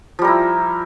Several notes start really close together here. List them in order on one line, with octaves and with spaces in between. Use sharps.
F3 G3 A#4 E4